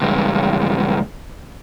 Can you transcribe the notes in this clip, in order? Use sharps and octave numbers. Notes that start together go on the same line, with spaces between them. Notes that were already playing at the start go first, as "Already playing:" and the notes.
C#2 G2